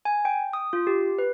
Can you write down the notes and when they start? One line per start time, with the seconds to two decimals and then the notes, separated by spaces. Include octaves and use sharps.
0.05 G#5
0.25 G5
0.53 D#6
0.73 F4
0.87 G4
1.18 B4